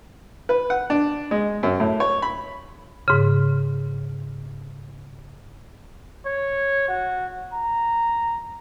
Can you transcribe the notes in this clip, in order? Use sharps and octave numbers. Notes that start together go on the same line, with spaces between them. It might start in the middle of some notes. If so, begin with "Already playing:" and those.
B4
F#5
D4
G#3
F#2
A2
C#5
B5
G#2 C#3
C#5
F#4
A#5